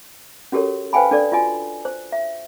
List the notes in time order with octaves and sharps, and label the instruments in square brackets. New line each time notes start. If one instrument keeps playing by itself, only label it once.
[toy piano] C#4 F#4 G4 A4 A#4 C#5
B4 C5 F5 G5 G#5 B5
D4 A4 D5
F4 F#4 D#5 G#5
C5
E5